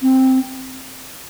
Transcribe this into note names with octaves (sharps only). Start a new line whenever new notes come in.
C4